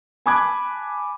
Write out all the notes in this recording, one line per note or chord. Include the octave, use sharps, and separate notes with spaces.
G#5 A5 B5 D6 F#6 G#6